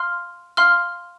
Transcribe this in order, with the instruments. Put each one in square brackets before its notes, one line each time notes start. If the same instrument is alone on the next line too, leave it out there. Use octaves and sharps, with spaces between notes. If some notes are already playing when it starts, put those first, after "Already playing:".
Already playing: [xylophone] F5 C6 F6
F5 C6 F6